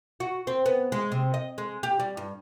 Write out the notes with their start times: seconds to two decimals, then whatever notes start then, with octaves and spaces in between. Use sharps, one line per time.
0.20 F#4
0.47 C4
0.66 B3
0.92 G#3
1.12 C3
1.34 D#5
1.58 G#3
1.83 G4
2.00 G3
2.17 G2